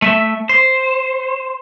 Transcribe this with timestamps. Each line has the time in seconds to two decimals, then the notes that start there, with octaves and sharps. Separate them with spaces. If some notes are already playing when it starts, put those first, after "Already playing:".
0.02 A3 E5
0.49 C5